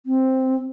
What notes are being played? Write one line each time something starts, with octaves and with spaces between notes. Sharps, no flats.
C4